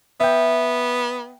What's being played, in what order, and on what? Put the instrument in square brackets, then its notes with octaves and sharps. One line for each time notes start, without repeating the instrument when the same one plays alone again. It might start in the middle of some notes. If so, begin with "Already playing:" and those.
[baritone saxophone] B3 [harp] E5 G5